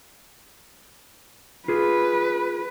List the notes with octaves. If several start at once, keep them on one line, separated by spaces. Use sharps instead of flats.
F4 G#4 B4